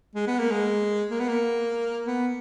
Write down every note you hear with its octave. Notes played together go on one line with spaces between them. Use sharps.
G#3
B3
A#3
G#3
A#3
B3
A#3
B3